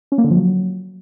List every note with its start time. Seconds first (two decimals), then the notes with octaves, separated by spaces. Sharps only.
0.12 C#4
0.18 A#3
0.24 D3
0.31 F3
0.37 F#3